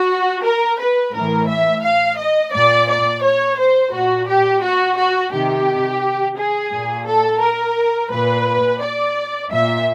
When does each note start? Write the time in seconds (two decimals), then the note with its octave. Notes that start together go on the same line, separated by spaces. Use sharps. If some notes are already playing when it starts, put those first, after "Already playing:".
Already playing: F#4
0.44 A#4
0.80 B4
1.15 A2 E3 A#4
1.48 E5
1.83 F5
2.18 D#5
2.53 A#2 D5
2.89 D5
3.23 C#5
3.58 C5
3.93 A#2 F#4
4.29 G4
4.63 F#4
4.97 F#4
5.32 C3 D#3 G4
6.37 G#4
6.73 A#2
7.07 A4
7.41 A#4
8.12 A#2 B4
8.81 D5
9.51 A#2 E5